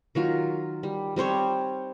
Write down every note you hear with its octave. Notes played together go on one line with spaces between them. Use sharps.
D#3 F#3 F4
G3
G3 C4 C5 C#5